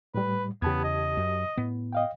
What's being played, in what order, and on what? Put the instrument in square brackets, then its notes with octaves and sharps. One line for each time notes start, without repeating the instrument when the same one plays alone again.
[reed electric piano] A2 G3 [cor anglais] B4
[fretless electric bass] E2 C#3 [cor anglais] B3 [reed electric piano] G4 A5 G#6
[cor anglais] D#5
[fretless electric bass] F#2
A2 B3
[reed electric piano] D#5 F5 G5